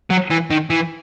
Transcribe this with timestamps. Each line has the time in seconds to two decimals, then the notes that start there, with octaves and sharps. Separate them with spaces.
0.10 F#3
0.31 E3
0.51 D#3
0.70 E3